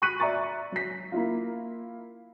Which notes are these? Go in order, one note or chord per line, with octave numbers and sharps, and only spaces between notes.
B5 C#6 F#6 B6 D#7 F#7
D5 E5 A#5 C#6 A6
F#3 B6
A#3 E4 F4